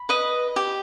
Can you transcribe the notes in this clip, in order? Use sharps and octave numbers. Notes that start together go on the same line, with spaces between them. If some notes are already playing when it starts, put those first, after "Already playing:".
Already playing: B5
B4 D#5
G4